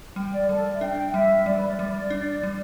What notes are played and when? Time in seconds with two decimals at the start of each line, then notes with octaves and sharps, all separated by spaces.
0.16 G3 G5
0.33 D5
0.49 G3 A4
0.65 D5
0.74 E5
0.81 D4 G5
1.13 G3 E5
1.46 G3 D5
1.57 B4
1.68 D5
1.79 G3
2.11 D4
2.43 G3